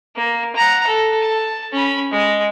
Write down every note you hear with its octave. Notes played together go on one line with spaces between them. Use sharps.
A#3
F#5 A#5
A4
A5
C#4 B5
G#3